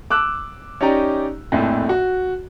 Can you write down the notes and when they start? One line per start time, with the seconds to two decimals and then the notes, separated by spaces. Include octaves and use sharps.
0.10 D6 E6 F#6
0.81 C#4 D#4 G4 D5 A#5
1.52 A#1 F2 A2
1.89 F#4